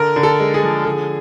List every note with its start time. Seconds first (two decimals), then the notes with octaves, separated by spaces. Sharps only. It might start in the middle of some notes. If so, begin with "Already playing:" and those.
Already playing: D3 A#4
0.16 D3
0.23 A4
0.39 G#3
0.54 G#4
0.63 F3
0.85 D3